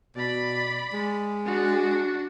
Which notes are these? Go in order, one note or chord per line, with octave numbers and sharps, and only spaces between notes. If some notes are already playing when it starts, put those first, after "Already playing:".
B2 D5 B5
G#3
D4 F#4